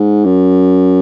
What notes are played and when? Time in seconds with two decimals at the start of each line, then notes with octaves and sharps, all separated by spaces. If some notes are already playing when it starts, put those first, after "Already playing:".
Already playing: G#2
0.25 F#2